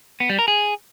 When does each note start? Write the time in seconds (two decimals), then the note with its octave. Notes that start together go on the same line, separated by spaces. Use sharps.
0.20 B3
0.30 G3
0.39 A#4
0.48 G#4